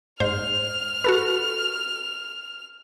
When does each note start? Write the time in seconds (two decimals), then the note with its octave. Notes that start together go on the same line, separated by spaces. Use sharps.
0.20 G#2 C5 F6 F7
1.04 F#4 A4 B4